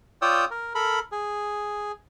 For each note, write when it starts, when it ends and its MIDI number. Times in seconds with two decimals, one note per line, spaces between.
0.22 0.45 65
0.22 0.45 73
0.22 0.45 74
0.22 0.45 79
0.22 0.45 87
0.22 0.45 88
0.51 0.73 70
0.75 0.99 69
0.75 0.99 70
0.75 0.99 83
1.12 1.92 68